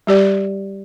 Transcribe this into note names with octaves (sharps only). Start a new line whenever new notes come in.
G3 G4 D5